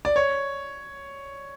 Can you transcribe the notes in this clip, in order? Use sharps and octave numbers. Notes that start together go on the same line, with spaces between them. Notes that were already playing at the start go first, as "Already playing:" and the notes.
D5
C#5